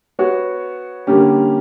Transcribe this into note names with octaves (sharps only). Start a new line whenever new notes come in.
B3 F#4 C#5
D3 G3 A#3 C#4 G4